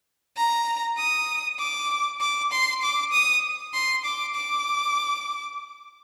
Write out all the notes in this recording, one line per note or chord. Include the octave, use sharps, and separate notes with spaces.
A#5
D#6
D6
D6
C6
D6
D#6
C6
D6
D6